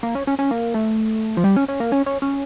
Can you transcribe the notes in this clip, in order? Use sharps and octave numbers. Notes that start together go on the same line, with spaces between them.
A#3
C#4
C#4
C#4
A#3
A3
F3
G3
C#4
C#4
A#3
C#4
C#4
C#4